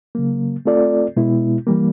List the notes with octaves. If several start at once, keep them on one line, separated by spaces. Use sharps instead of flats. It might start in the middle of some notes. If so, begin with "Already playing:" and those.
C#3 F#3 A#3
A3 C4 F4 A4 D5
B2 G#3 B3 E4
E3 G3 A#3